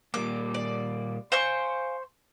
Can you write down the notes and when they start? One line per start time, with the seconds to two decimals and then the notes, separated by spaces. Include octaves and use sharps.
0.14 A#2 G3 A#3 D6
0.54 D5
1.32 C5 F5 G#5 C6 C#6